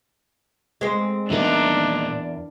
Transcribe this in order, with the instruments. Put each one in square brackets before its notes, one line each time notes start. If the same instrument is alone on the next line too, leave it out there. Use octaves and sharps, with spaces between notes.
[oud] G#3 C4
[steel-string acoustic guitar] E2 A#4 [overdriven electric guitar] A#2 D#4 [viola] D4